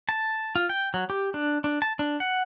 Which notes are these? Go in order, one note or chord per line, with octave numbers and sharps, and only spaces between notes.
A5
F4
G5
F#3
G4
D4
D4
A5
D4
F#5